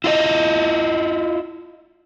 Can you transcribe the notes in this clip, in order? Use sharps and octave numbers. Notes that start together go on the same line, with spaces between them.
E4 F4 C5 D#5